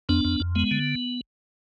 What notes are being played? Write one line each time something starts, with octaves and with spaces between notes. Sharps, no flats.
F2 B3 D4
F2
F2
G#3 B3
D3